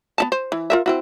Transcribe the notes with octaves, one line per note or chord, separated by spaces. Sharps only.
B3 D#4 A5
C5
E3
F4 A#4 E5
C4 E4 F#4